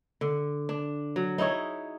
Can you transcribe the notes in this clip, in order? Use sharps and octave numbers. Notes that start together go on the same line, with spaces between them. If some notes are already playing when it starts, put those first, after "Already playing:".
D3
D4
F#3
D#4 E4 G#4 C#5